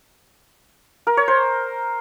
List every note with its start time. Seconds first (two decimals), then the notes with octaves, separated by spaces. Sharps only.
1.07 A#4
1.17 C#5
1.28 C5